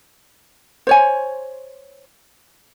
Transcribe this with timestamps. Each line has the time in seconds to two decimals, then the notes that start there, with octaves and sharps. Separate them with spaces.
0.87 C5 C#5 G#5